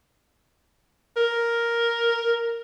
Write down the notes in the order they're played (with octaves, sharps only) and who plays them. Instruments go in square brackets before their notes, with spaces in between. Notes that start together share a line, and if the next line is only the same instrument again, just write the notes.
[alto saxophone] A#4